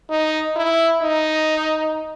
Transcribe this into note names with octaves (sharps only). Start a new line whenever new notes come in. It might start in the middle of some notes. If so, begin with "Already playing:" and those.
D#4
E4
D#4